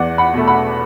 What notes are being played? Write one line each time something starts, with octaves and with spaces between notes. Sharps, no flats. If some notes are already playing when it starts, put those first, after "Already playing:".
Already playing: E2 D5 F#5
F#5 B5
B2 A3
F#5 B5